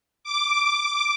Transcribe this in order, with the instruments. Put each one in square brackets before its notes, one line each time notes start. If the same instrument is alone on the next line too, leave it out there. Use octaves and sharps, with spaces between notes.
[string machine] D6